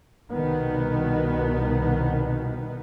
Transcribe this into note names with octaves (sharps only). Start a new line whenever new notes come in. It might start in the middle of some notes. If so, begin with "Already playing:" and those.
C2 B2 D#3 B3